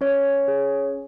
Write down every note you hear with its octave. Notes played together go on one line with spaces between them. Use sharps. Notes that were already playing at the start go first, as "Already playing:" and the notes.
C#4 C#5
G#4